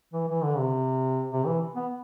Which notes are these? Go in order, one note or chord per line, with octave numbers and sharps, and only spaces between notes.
E3
E3
D3
C3
C3
E3
B3